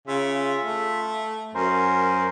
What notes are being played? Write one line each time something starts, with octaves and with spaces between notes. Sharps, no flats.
C#3 F4 E5
A3
F#2 C#4 A#4 C5